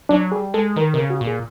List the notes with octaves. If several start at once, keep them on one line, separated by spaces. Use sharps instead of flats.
F#3 D4
G3 G#4
G#3 A4
D#3 A#4
C3 A#4
C#3
F#4
A#2
G#4